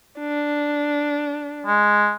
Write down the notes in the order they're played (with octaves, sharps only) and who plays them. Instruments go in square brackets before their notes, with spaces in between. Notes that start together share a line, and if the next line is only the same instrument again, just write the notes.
[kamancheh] D4
[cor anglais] G#3